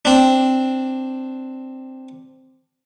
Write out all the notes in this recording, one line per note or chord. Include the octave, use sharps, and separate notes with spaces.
C4 D4